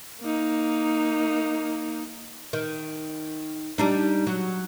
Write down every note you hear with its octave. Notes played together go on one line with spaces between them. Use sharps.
A#3 D#4
D#3
G3 D4 D#4
F#3